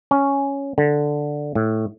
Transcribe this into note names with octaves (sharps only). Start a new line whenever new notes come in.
C#4
D3
A2